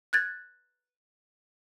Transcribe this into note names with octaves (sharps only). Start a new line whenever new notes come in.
F#6 G#6 A6